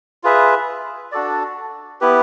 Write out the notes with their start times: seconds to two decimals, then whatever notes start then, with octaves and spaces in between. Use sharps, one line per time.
0.24 F4 G#4 B4 E5
1.12 D4 F#4 A4 D5
2.01 B3 E4 G4 B4